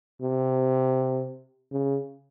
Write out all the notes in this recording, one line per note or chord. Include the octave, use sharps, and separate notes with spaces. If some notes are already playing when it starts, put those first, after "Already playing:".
C3
C#3